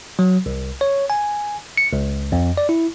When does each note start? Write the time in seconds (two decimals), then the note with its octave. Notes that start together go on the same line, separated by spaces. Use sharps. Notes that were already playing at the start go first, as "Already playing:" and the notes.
0.19 F#3
0.46 C2
0.81 C#5
1.10 G#5
1.77 C#7
1.93 C#2
2.32 F2
2.57 D5
2.69 E4